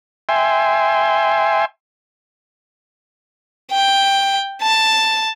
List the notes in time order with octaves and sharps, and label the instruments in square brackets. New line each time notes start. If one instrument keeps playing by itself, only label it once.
[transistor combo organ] E5 G5 G#5 C6
[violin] G5
A5